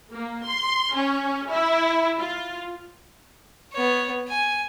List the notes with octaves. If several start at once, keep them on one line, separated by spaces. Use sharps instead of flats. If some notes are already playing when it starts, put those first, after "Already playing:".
A#3
C6
C#4
E4
F4
B3 C#5
G#5